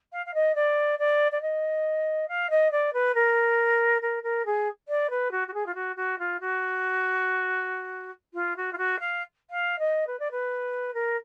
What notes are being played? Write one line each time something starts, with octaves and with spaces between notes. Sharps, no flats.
F5
F5
D#5
D5
D5
D5
D#5
F5
D#5
D5
B4
A#4
A#4
A#4
G#4
D5
B4
F#4
F#4
G#4
F4
F#4
F#4
F4
F#4
F4
F#4
F4
F#4
F5
F5
D#5
B4
D5
B4
A#4